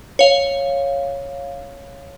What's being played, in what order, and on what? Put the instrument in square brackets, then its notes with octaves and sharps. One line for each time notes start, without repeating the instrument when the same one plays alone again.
[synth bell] C#5 F5